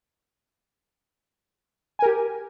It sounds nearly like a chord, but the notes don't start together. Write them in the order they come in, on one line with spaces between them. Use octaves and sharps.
G#5 A#4 G4